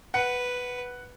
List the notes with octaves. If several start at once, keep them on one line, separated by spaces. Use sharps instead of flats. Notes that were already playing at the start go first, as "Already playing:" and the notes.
B4 F#5 C#7